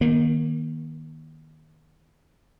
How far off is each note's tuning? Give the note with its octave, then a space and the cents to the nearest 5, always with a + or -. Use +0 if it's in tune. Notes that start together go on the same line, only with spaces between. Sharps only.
D#3 +0 A#3 +35